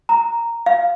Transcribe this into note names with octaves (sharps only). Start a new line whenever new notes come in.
A#5
F5